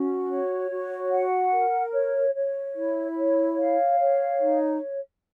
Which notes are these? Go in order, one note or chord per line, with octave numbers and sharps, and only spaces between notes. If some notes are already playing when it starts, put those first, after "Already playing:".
Already playing: C#4 F#4
C#5
F#4
F#5
A#4
C#5
C#5
E4
C#5
F5
C#5
D#4